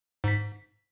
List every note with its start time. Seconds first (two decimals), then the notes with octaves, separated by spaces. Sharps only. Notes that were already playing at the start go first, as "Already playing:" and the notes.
0.24 G#2 B6